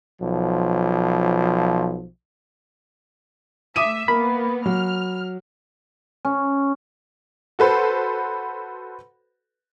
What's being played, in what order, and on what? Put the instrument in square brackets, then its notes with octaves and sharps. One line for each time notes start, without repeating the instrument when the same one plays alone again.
[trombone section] B1 F3
[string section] A3 E5 [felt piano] D6 D#6 D#7
[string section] A#3 B3 [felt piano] A#4 [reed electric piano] B5
[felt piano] F#3 [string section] F6
[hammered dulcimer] C#4
[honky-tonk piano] F#4 A4 B4 C5